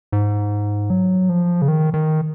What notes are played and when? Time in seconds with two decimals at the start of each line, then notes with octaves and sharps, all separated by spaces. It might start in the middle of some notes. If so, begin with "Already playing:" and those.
0.12 G#2
0.90 F#3
1.29 F3
1.62 C#3
1.68 D#3
1.94 D#3